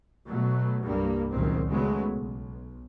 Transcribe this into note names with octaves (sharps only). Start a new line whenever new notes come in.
B2 F#3 A3
C2 G2 G3 A#3
F#1 C#2 F#2 A#2 D#3 C4
C#3 F#3 G#3 A3 B3
B1